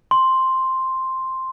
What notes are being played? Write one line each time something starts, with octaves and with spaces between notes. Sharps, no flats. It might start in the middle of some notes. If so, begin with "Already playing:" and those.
C6